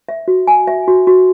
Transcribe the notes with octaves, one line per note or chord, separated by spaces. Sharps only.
E5
F#4
G#5
E5
F#4
F#4